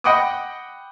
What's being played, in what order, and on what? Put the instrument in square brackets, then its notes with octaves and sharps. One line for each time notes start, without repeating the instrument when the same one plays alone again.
[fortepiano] D#5 F#5 G5 B5 D6 D#6